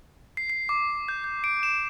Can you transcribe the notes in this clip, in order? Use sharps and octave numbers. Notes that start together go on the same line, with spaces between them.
C7
C7
D6
G6
G6
D7
E7